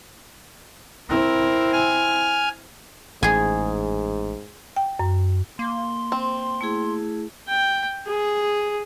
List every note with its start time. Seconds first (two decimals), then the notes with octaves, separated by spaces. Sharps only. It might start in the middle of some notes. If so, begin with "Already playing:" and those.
1.10 C4 E4 A#4
1.73 G#5 F6
3.23 A1 G#2 G#4 G#5
4.77 G5
4.99 F#2
5.59 A#3 C6
6.12 C4
6.61 A3 E4 G#4
7.48 G5
8.07 G#4